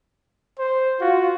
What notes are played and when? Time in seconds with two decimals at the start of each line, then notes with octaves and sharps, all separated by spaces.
0.59 C5
1.01 F4 F#4